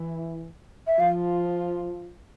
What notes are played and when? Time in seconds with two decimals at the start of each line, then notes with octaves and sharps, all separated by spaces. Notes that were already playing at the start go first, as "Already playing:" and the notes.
Already playing: E3 E4
0.87 E5
0.99 F3 F4 F5